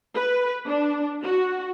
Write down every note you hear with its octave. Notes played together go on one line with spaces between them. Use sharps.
B4
D4
F#4